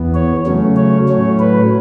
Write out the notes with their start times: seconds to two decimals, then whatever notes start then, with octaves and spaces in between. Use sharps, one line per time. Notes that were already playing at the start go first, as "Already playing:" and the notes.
Already playing: E2 E3 B3
0.14 C#5
0.46 C#3 F#3 A3 C#4
0.76 C#5
1.08 A2 F#3 A3 C#4 C#5
1.40 B4